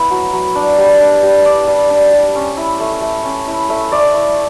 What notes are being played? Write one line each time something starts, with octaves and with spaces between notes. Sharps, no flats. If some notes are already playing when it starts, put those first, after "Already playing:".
Already playing: B3 E4
F#3
F#3
D4
G3
D4
G3
D4 D5
G3
D4
G3
C#4
E4
A3
A3
C#4
E4
A3 E5
A3 D5
E4